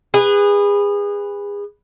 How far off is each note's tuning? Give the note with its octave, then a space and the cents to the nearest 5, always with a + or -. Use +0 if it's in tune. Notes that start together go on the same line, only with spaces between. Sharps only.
G#4 -30 B4 +0